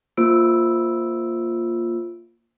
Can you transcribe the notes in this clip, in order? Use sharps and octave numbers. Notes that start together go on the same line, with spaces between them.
A#3 F4 C5 E6 D7